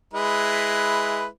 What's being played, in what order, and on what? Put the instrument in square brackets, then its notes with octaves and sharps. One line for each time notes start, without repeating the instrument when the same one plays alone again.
[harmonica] G#3 E4 B4